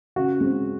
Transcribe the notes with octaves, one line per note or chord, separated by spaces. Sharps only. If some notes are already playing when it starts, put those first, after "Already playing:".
C#3 F#4
G#3 C4